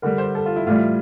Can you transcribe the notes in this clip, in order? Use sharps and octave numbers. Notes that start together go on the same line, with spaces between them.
D3 G3 A#4
C5
A4
F4
E4
A2 E3 G3 F4